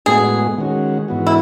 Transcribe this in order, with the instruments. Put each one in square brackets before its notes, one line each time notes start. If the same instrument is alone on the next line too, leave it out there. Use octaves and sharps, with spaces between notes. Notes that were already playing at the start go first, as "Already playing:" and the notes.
[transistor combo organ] A2 G#3 B3 F#4 [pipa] G#4
[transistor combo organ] D#3 G#3 C#4 F#4
G#2 E3 B3 F#4
[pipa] E4